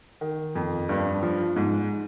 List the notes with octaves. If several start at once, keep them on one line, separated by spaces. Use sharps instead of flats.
D#3
F2
G2
F3
G#2